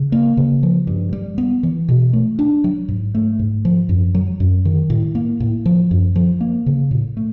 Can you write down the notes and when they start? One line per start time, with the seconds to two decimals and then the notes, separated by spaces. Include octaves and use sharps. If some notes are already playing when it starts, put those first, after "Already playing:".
Already playing: C#3
0.12 A#3
0.37 C#3
0.63 F3
0.87 G2
1.13 G3
1.38 B3
1.63 E3
1.89 B2
2.13 A3
2.39 D4
2.64 F#3
2.88 G#2
3.15 A3
3.39 G#2
3.65 F3
3.89 F#2
4.15 F#3
4.40 F#2
4.65 D#3
4.90 A2
5.15 A#3
5.40 A2
5.66 F3
5.91 F#2
6.16 F3
6.41 A#3
6.66 C#3
6.91 A2
7.17 A3